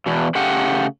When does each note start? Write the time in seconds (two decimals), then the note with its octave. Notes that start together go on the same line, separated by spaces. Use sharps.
0.06 E2 B2
0.35 C#3 A3 G4 F#5